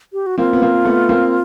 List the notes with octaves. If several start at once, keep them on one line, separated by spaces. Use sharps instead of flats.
G4
F#4
A#3 C4 F4
B3
A#3 C4
A3 B3
A#3 C4